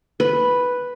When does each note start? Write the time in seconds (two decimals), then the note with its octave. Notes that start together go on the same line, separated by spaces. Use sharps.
0.20 B4